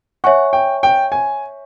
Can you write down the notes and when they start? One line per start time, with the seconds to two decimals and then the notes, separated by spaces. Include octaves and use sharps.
0.24 C#5 E5 F#5 G#5 C#6
0.53 G5
0.83 G5
1.12 G#5